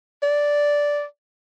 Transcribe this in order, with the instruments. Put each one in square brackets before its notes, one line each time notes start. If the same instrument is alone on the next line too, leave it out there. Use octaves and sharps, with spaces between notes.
[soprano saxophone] D5